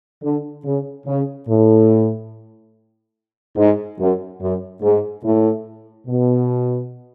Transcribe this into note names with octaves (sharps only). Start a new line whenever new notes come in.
D3
C#3
C#3
A2
G#2
F#2
F#2
G#2
A2
B2